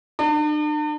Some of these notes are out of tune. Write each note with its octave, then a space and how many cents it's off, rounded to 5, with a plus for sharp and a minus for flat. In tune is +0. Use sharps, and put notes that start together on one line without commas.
D4 +45